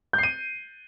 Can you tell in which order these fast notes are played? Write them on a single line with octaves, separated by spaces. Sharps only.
G6 C7 D#7